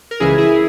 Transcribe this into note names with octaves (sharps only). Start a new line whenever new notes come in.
A#4
C#2 C#3 E3 E4 G#4
E4 G#4